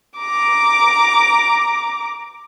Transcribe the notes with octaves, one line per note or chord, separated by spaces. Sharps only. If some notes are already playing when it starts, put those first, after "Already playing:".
A#5 D6